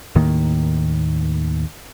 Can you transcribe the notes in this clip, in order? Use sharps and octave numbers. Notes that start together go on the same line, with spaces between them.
D#2 A2 D#3 A#3